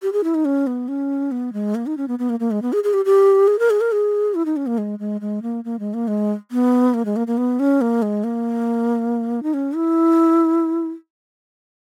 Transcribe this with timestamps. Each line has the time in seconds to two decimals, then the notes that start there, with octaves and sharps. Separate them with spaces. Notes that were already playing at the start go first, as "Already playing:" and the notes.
0.02 G4
0.13 G#4
0.24 E4
0.35 D#4
0.45 C#4
0.67 B3
0.88 C#4
1.32 B3
1.53 G#3
1.75 A#3
1.87 D#4
1.97 C#4
2.08 B3
2.19 B3
2.30 A#3
2.40 A#3
2.51 G#3
2.62 B3
2.73 G#4
2.84 G#4
2.93 G4
3.05 G4
3.48 G#4
3.59 A#4
3.70 G#4
3.81 A#4
3.92 G#4
4.35 E4
4.45 D#4
4.57 C#4
4.67 A#3
4.78 G#3
4.99 G#3
5.21 G#3
5.42 A#3
5.64 A#3
5.79 G#3
5.94 A#3
6.08 G#3
6.51 B3
6.94 A#3
7.05 G#3
7.16 A#3
7.27 A#3
7.38 B3
7.60 C#4
7.81 A#3
8.02 G#3
8.24 A#3
9.43 D#4
9.54 C#4
9.75 E4